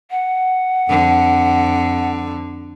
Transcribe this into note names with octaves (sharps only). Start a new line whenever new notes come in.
F#5
F2 D3